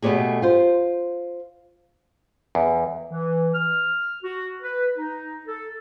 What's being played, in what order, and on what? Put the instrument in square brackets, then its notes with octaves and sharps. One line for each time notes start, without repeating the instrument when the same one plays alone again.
[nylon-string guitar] B2 A3 B3 C#4 G4 G#4
F4 C5
[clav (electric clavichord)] E2
[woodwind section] E3
F6
F#4
B4
D#4
A4